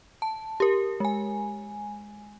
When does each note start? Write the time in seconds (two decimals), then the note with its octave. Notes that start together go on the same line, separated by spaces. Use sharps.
0.22 A5
0.60 G4 A#4
1.00 G#3 G#5